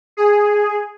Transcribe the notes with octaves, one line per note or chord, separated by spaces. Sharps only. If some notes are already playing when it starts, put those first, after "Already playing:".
G#4